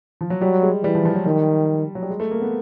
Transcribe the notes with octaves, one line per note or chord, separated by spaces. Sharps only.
F3
F#3
F#3 G3
G#3
E3 G3
F3
F3
F#3
D#3 G3
F#3
G3
G#3
A3
A#3
B3